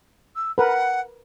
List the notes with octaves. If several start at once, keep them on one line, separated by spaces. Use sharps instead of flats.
E6
A#4 B4 F#5